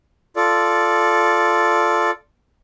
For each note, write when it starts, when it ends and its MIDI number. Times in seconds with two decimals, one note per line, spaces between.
0.36 2.11 65
0.36 2.11 69
0.36 2.11 74